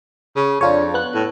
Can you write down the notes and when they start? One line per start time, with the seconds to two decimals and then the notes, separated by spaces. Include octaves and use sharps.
0.36 C#3
0.61 F2 D4 F4 C#5
0.94 B3 F#6
1.15 A2